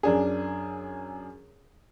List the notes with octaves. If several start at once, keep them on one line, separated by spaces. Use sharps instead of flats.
F#2 D4 G#4